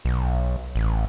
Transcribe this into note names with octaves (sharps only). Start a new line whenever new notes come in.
B1
A1